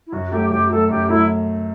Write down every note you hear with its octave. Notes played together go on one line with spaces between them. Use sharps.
E4
F#2 F#4
F#3 A3 G4
F#2 G4
F#3 A3 A4
F#2 G4
F#3 A3 E4